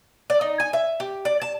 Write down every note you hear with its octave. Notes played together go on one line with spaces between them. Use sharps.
D5
D#4
G#5
E5
G4
D5
A5